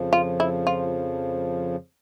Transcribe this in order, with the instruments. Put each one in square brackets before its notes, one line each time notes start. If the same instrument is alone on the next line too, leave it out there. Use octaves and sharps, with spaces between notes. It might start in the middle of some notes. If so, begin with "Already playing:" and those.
Already playing: [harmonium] F2 C#3 F3
[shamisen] F4
E4
F4